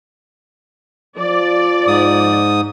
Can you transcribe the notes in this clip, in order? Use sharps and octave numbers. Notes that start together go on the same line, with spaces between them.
F3 D5
G#2 D#6